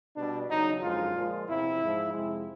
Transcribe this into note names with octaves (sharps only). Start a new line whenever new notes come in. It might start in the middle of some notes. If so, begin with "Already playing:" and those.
B2 G3 D4
E2 C#3 F#3 D#4
F#2 D3 F3 G#3 F4
A#2 F3 G#3
E2 C3 F3 E4
G#2 F3 G#3
F2 C3 F3 G#3